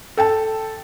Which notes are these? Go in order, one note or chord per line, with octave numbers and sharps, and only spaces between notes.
A4 G5 A5